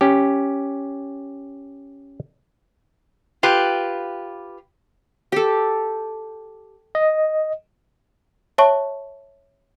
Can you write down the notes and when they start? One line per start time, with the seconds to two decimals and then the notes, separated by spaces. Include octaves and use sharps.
0.01 C#4 G4
3.43 F4 G4 B4
5.32 G4 A4
6.95 D#5
8.58 C#5 E5 A5 C#6